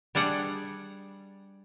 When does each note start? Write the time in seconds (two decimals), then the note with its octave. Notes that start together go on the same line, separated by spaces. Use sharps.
0.15 G3 D4 G#4 F#5